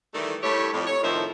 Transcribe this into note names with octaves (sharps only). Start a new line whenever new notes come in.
D#3 E3 G3 A3
G2 A3 E4 G4 C#5
F2 A2
C#5
F2 A2 D#3 F3 C5 E5